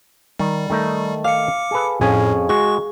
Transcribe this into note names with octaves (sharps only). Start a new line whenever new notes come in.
D#3 G3
D#3 A3 D#4
F5 D6 C#7
G#4 A4 B4
F2 A2 C#4 G#4
G#3 F#4 C#6